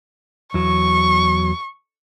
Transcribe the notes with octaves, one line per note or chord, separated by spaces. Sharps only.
E2 F#3 C#6